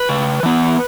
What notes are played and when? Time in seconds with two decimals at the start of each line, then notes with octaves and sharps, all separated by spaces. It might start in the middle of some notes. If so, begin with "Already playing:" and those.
Already playing: B4
0.09 C#3
0.43 E3 B3